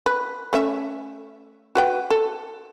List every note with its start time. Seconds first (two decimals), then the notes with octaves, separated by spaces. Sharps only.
0.06 B4
0.53 A3 C#4 E5
1.75 F#4 B4 G5
2.10 A4